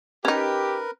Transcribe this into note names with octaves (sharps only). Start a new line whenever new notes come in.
C#4 D#4 G4 A#4 B4